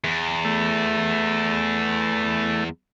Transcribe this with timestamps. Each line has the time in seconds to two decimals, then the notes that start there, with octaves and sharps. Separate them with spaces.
0.04 E2
0.45 A3